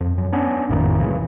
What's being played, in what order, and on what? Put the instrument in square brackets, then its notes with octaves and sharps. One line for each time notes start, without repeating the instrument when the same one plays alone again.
[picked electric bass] F2
F#2
B3 C#4 D4
G#1 F2 A2 D#3
F#1 B1 C#3 E3